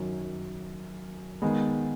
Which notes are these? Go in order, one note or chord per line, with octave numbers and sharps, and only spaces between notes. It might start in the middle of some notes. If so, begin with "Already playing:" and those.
Already playing: F#2 D#3 F#3
D#3 G#3 B3